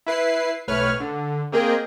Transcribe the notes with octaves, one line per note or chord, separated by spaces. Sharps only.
E4 B4 C7
B1 A2 B4 C#5 F6
D3
A#3 C4 G#4 A#4 D#5 G5